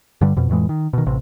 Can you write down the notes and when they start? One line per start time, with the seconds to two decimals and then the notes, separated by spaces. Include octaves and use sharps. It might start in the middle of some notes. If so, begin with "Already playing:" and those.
0.21 G2 D3 G3
0.36 F2 B2
0.49 F2 A2 E3 G#3
0.69 D#3
0.93 B2 D#3
1.06 A1 C3